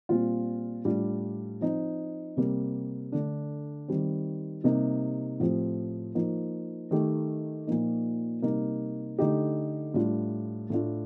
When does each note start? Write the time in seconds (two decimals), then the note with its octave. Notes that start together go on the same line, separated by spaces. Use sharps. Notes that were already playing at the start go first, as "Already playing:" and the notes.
0.09 A#2 G3 C4 F4
0.85 A2 G3 D4 F4
1.61 F3 C4 D#4
2.37 C3 G3 A#3
3.12 D3 A3 D4
3.88 D#3 G3 C4
4.64 C3 G3 A#3 D#4
5.40 A2 F3 C4 G4
6.15 F3 A#3 D#4
6.91 D#3 A3 D#4 G4
7.67 A#2 F3 A#3 D#4
8.42 C3 G3 A#3 D#4
9.19 D3 A3 D#4 G4
9.94 A2 G3 D4 F4
10.70 A2 A3 D4 F4